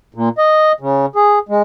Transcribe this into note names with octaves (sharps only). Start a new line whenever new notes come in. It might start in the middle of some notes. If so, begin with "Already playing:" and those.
A#2
D#5
C#3
G#4
G#3